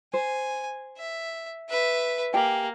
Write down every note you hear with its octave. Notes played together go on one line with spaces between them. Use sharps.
C5 G#5
E5
B4 E5
A#3 G4 G5 G#5